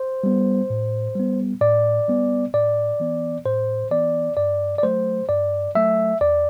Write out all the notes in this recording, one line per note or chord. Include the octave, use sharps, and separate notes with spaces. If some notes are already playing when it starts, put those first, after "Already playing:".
Already playing: C5
G3 B3
A2
G3 B3
A2 D5
G3 B3
A2 D5
E3 B3
A2 C5
E3 B3 D5
G2 D5
D5
F#3 A3 C5
G2 D5
F#3 A3 E5
E2 D5